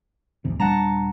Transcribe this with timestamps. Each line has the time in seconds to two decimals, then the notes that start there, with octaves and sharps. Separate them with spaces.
0.45 G1 D2 C3
0.60 D#1 G3 D4 F#5 A5 A#5